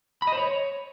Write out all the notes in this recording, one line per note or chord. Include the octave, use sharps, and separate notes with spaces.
B5
D#5
C5
C#5